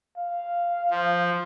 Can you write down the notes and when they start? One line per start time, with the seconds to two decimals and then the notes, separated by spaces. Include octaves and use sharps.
0.17 F5
0.90 F3